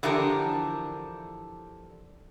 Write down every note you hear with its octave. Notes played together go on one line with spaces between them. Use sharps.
D3 E3 F3 D4 G4 A#4